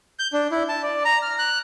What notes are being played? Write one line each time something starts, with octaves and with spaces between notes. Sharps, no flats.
G6
D4
E4
A5
D5
A#5
F6
F#6